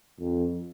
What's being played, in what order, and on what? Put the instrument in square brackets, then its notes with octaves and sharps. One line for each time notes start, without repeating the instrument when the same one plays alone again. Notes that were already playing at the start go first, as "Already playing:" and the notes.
[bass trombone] F2